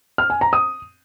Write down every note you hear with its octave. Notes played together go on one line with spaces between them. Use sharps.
F6
G#5
A#5
D#6